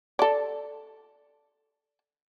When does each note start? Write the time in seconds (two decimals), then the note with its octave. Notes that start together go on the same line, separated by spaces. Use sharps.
0.19 A4 D5